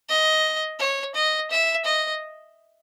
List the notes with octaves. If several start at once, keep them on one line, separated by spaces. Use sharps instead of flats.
D#5
C#5
D#5
E5
D#5